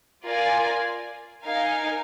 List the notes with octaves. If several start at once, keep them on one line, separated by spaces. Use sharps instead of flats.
F4 A#4 D5 G#5
D#4 A#4 F5 G#5